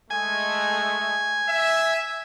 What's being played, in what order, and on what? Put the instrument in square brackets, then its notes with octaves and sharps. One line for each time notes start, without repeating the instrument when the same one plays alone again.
[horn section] G#3 A3 [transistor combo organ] G#5
[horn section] E5